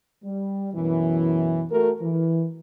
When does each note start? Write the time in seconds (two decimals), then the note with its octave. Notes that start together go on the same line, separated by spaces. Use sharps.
0.24 G3
0.74 F#2 B2 E3
1.71 A3 F#4 A4 A#4
2.02 E3